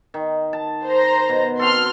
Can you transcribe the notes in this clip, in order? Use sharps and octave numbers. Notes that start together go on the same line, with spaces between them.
D#3
A5
C5 A#5
B2
C4 F#4 A4 C6 F6